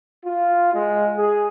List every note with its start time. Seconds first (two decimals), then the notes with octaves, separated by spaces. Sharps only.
0.25 F4
0.74 G#3
1.17 G#4